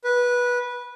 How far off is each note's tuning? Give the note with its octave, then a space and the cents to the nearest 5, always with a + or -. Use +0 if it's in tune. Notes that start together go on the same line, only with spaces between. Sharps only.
B4 -15